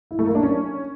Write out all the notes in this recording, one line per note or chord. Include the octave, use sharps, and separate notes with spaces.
E4
A3
A#3
D4
C#4